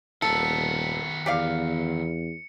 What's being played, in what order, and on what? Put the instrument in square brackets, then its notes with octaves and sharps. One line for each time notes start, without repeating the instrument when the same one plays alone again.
[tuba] D#1 [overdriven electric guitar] D#3 B3 [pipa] A4 [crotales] C#7
[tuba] E2 [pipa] G4 D5 F5